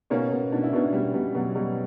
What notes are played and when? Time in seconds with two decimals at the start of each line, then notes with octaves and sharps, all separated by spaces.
0.10 B2 A#3 C#4
0.32 B2
0.52 B2 D4
0.63 E4
0.73 B2 B3 D4
0.93 B2 G3
1.13 B2 G3
1.35 B2 F#3
1.55 B2 G3